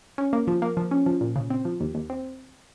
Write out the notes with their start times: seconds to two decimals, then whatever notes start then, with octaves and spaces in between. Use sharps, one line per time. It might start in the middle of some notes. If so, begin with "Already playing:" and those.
0.18 C#4
0.33 A#3
0.47 F3
0.62 A#3
0.77 F3
0.91 C#4
1.06 F3
1.21 A#2
1.36 C#3
1.50 C4
1.65 F3
1.80 D#2
1.94 D#2
2.10 C4